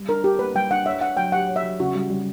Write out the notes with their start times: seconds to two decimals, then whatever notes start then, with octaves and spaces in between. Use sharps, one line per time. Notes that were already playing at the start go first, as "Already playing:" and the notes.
Already playing: G3
0.09 D4 A#4
0.23 D4 G4
0.39 A#3 B4
0.55 G3 G5
0.71 D4 F#5
0.86 C#5 E5
1.01 C#5 F#5
1.17 F#3 G5
1.32 G4 F#5
1.49 C#5
1.56 E5
1.63 F#3
1.80 C#3 F#4
1.95 G3
2.10 G3